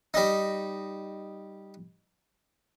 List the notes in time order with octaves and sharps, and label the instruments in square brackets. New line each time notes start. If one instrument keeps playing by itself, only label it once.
[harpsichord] G3 D#4